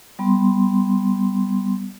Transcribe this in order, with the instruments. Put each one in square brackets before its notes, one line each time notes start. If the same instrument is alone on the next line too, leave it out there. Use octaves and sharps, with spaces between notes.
[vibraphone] G3 B3 C6